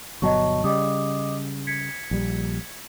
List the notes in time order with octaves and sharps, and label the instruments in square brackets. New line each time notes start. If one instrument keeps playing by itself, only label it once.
[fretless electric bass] G1 B2 F#3 [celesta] D#5 A5 C#6
[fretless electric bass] C#3 G3 [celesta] D#5 D6 D#6
[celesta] G#6 B6 C#7
[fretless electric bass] A#1 G3